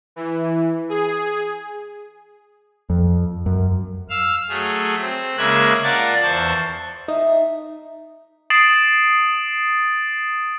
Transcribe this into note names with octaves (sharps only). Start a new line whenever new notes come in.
E3
G#4
F2
F#2
F5 E6 F6
F#3 A3 G#4
C4
C#3 G#3 A#3 E5 F#6 G#6
F4 A#4 D5 F#5 A5
E2 C5 A5 C#6
D#4 E5
D#6 A6 C7 D7 E7 F#7